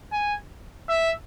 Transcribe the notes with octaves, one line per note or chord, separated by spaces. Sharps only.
G#5
E5